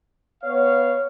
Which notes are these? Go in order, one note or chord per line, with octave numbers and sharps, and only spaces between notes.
B3 C#5 F5